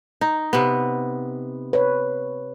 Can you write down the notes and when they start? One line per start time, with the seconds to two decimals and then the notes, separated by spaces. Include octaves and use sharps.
0.21 D#4
0.53 C3 B3
1.73 B4 C#5